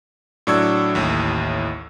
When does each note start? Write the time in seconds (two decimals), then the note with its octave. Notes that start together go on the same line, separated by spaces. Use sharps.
0.47 A2 F#3 D4 C#6 E6 G#6
0.95 A1 D#2 A2